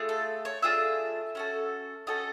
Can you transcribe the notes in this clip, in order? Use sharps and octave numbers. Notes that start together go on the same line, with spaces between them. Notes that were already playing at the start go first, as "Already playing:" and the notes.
Already playing: A3 F4 G#4
A4
C#5
A3 D4 F4 G#4 E5
C#4 F#4 A4
C#4 F#4 A4 D#5